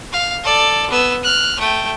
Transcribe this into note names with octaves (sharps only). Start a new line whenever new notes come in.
F5
A4 D5
B3 E6
F6 F#6
A3 G5